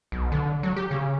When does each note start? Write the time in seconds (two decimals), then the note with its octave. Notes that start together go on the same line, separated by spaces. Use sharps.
0.12 B1
0.32 D3
0.63 F#3
0.76 G4
0.91 C#3